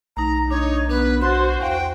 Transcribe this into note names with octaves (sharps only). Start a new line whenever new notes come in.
B1 A3 D#4 A#5
D4 D#4 C#5 C#6
B3 D4 B4
F#4 C5 C6 F#6 A6
E2 F5 G5